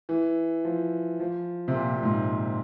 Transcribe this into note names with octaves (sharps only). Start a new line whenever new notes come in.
E3
F3
F3
C3
A#2
A#2
G#2